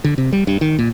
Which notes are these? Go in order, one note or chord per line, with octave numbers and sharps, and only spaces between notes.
D3
C3
G3
G2
D#3
A#2